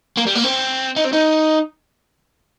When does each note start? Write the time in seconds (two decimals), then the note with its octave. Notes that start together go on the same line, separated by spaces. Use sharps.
0.18 A#3
0.27 G3
0.35 A#3
0.44 C4
0.96 D#4
1.05 C4
1.13 D#4